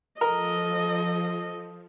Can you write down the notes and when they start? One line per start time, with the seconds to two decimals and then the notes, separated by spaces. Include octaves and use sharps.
0.21 F3 A4 A#4 D#5